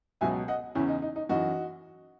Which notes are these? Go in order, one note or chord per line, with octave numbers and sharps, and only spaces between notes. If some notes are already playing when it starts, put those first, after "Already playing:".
C#2 B2 F#3 E5 G#5
D#5 F#5
E2 C#3 E3 C#4 E4
D#4
D#4
D#4
F#2 E3 D#4 F#4